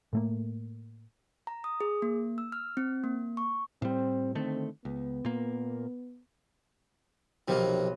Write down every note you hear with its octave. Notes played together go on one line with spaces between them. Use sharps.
A2 A3 A#3
A#5
D#6
G#4
A#3
E6
F6
C4
A#3
C#6
A2 G3 C4
D3 D#3 A3 C4
C#2 B3
A#2 A#3
B1 C3 D#3 F3